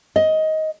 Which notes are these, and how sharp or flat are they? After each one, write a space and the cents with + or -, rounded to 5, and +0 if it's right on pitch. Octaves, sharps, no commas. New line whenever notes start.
D#5 +15